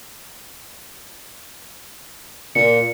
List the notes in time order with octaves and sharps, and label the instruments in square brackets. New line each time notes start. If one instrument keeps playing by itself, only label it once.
[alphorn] A#2 [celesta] C#7